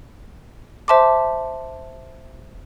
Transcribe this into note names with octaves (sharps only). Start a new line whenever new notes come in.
C5 E5 A5 C6 D6